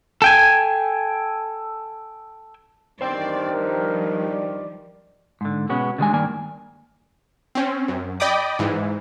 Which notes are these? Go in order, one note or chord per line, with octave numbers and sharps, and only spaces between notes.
A4 G5 G#5
E2 G2 D#3 C5 D5 G5
F3 G3 A#4
D5
G#2 D3
B2 G#3 B3 C#4 F#4
D3 D#3 G3 G#3 D4 G#5
G2 D#3 A#3 D5 G#5
C4 C#4
F#2
D5 D#5 G5 B5 D6 D#6
G#2 E3